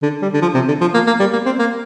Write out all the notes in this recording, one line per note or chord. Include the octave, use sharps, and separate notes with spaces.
D3
G3
D3
F3
C3
D3
F3
A#3
A#3
G3
A#3
C4
A#3